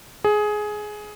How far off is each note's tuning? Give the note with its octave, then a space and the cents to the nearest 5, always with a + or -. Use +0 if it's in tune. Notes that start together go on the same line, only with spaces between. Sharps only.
G#4 +15